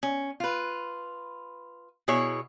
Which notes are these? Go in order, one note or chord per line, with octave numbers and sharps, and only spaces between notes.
C#4
F4 B4
B2 E4 G#4 C#5